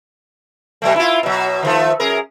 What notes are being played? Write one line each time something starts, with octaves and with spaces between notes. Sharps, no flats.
B2 F#3 A3
E4 F4
B2 F#3
D#3 F3 A3
F#2 G#4 A#4